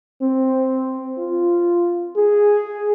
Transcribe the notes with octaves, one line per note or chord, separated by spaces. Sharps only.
C4
F4
G#4